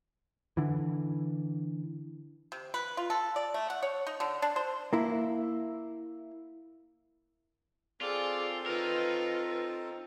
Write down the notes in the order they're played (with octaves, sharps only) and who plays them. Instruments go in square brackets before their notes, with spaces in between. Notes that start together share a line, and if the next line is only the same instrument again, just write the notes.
[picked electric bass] D3 E3
[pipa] C3
B4
F4
A4
D5
A3
F#5
C#5
D#4
D3
D4
C5
[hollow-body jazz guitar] A#3 E4
[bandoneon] C4 A4 [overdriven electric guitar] F4 [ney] G#4 [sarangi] D5
[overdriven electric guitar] D#4 A#4 [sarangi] F4 [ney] B4